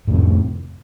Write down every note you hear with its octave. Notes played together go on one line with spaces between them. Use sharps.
F2 A2 C3